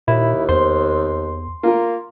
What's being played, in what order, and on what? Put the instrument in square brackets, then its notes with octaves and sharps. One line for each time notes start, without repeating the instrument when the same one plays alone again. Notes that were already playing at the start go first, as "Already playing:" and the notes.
[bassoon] D#2 [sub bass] A#2 [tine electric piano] E4
[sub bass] E2 [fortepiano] C5 [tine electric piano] C6
[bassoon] A#3 [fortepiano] F4 A#4